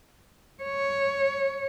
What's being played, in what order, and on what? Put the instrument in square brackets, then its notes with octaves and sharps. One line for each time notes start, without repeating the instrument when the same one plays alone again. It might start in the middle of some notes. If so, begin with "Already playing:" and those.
[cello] C#5